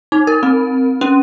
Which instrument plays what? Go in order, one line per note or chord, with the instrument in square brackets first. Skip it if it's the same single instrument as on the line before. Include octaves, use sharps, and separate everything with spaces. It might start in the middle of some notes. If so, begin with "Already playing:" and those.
[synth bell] D#4
A#4
C4
C#4